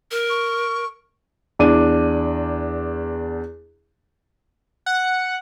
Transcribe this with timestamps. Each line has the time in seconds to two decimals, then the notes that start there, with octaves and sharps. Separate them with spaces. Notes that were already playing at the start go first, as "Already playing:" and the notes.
0.11 A#4
0.30 C#6
1.59 E2 D4 D#7
4.86 F#5